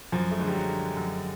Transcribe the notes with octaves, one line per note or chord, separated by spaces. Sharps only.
F#2 F3
A3
D3 G#3
G3
F#3
D3
F#2